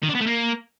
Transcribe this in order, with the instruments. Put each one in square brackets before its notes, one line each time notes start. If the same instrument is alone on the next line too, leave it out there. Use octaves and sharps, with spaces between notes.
[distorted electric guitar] D#3
D4
B3
A3
A#3